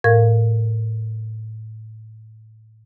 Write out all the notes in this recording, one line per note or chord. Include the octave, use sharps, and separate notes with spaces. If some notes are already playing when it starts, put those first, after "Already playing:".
A2 A#4 F5 G#6